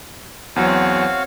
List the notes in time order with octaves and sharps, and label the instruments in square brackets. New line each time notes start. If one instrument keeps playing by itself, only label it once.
[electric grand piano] E2 F#3 [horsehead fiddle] C4 C#5 [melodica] F#4 F5